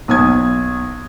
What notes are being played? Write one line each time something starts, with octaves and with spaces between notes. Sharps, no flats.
B1 D#6 G#6